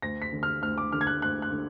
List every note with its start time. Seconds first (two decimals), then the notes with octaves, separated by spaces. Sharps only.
0.02 D2 A#6
0.22 B6
0.32 D3
0.43 F6
0.62 D2 F6
0.78 D6
0.92 D3 F6
1.01 G#6
1.07 F#6
1.22 D2 F#6
1.42 F#6
1.52 D3